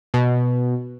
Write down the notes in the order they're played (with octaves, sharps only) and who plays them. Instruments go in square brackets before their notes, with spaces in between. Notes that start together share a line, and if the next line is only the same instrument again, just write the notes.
[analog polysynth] B2